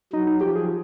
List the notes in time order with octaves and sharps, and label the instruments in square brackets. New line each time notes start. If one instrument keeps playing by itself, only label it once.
[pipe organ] F#3 [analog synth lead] D#4
[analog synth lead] D#4
[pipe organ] F3 [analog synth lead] G4
[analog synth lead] G#4